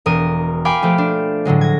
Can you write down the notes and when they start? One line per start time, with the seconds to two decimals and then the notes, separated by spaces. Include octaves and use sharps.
0.06 E1 A#4 D#6 D#7
0.65 F5 G5 G#5 B5 D6 F6
0.82 F3 A3 G4
0.98 D4
1.45 A2 D3 F#3 G#3
1.61 G#6 A#6